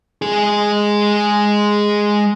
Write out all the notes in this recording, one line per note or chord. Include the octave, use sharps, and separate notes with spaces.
G#3 G#4